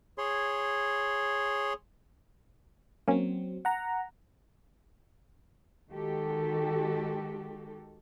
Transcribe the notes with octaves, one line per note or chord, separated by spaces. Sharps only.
G#4 C#5 C6
F#3 A#3 C4 C#4
F#5 A#5
D#3 G#3 F#4 G4 A4